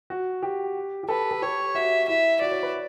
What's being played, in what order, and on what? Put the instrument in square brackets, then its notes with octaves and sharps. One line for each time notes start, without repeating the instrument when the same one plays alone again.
[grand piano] F#4
G4
G4
[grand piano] A4 [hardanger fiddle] B4
[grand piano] A4
[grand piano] G4 [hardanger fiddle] C#5
[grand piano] F#4 [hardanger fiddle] E5
[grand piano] E4 [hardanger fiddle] E5
[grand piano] F#4 [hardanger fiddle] D5
[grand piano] C#5
B4